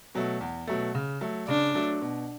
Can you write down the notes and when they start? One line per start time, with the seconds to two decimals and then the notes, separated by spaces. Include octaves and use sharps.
0.15 B2 F#3 A3
0.41 E2
0.67 B2 F#3 A3
0.95 C#3
1.21 F#3 A3
1.48 C#3 D4
1.75 F#3 A3
2.01 B2